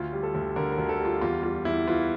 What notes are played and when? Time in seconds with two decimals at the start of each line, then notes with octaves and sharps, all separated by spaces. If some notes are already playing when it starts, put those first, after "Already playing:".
Already playing: D2 F4
0.13 G3
0.23 A4
0.34 D2
0.56 D3 A#4
0.72 A#4
0.78 D2
0.89 A4
1.00 G3
1.05 F4
1.21 E2 F4
1.43 G3 F4
1.65 E2 E4
1.88 E3 F4